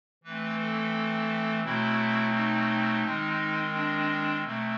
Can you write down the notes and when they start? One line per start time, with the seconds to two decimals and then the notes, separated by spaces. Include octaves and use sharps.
0.24 E3 A3 C4 B4
0.59 A4
1.64 B2 F#3 A3 C4 E4
2.34 D#4
3.04 D#3 G#3 C4
3.74 D4
4.44 B2 F#3 A3 C4